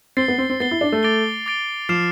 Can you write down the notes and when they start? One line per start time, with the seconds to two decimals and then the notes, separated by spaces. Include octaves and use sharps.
0.17 C4 A6 C7 G7
0.28 B3
0.38 C4
0.50 C4
0.60 B3 A6 C7 G7
0.71 E4
0.81 D4
0.92 A3
1.03 D6 A6 D7 G7
1.46 D6 A6 D7 G7
1.89 F3 D6 F6 C7 E7